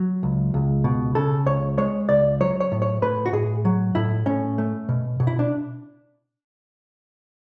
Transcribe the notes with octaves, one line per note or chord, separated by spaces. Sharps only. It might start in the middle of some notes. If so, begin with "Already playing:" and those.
Already playing: F#3
C#2
C#2
B2
C#3 A4
C#2 C#5
G#3 C#5
C#2 D5
F#3 C#5
C#5
A2
C#5
A2 B4
F#4
A2 G#4
F#3
A2 E4
A2 C#4
A3
B2
B2
E4
D4